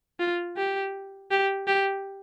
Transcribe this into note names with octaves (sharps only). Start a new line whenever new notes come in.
F4
G4
G4
G4